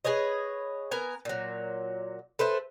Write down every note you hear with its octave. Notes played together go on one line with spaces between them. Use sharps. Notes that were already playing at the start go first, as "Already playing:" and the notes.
G#4 B4 C#5 D#5
B3 A#4 G#5
A#2 F#3
A4 B4 C5 E5